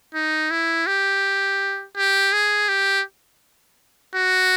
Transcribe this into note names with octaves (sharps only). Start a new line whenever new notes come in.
D#4
E4
G4
G4
G#4
G4
F#4